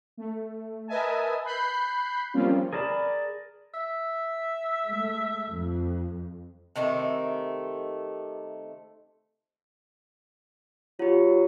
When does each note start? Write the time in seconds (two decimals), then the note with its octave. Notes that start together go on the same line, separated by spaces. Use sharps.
0.17 A3
0.88 A#4 B4 D#5 E5 G#5 A5
1.45 B5 F#6 G6 C7
2.34 F3 G3 A#3 C4 C#4 F4
2.73 G#4 A#4 D5 A5 B5
3.74 E5
4.89 G#3 A3
5.51 F2
6.76 C3 D#3 A3
10.99 F#3 F4 G4